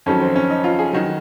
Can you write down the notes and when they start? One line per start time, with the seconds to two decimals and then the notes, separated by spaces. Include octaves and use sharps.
0.06 F2 D#3 F#3 C#4
0.21 C4
0.36 C#4
0.50 D#4
0.64 F4
0.79 G#4
0.93 D#3 F#3 F#4